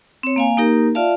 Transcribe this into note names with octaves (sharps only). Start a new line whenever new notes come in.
C4 C#5
A#3 F5 G#5
A#3 D#4 G4 A#4
F4 D5 E5 F5 A5